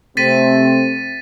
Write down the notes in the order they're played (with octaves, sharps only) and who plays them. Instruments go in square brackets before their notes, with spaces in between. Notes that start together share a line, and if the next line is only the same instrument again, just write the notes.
[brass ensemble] C3 A3 C4 [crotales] A6 B6 D#7